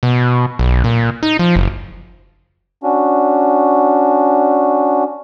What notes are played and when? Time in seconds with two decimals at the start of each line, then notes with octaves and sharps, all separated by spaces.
0.03 B2
0.59 B1
0.84 A#2
1.23 D#4
1.39 F3
1.56 F#1
2.83 C#4 D4 F#4